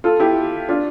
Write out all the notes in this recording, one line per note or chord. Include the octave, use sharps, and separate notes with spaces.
F4 A4
E4 G4
D4 F4